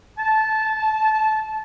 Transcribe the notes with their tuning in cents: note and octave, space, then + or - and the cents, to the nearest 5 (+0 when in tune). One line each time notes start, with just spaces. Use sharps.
A5 -20